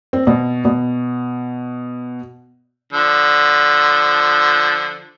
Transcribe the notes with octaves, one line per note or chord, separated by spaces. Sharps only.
C4
B2
B2
D3 F3